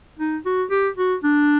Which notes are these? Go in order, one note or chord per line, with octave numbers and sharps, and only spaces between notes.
D#4
F#4
G4
F#4
D4